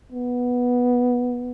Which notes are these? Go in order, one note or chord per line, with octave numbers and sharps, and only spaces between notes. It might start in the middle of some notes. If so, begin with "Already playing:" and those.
B3